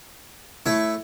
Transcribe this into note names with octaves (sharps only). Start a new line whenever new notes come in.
A3 E4 C#5